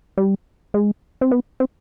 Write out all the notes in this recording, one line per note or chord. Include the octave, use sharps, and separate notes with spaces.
G3
G#3
C4
B3
C4